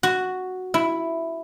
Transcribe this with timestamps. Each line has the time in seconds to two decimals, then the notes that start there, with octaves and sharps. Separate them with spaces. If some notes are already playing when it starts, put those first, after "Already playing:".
0.03 F#4
0.74 E4